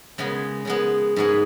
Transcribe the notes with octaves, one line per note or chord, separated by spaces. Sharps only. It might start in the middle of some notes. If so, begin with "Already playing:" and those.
C#3 G#3 B3
C#3 G#3 B3
G#2 G#3 B3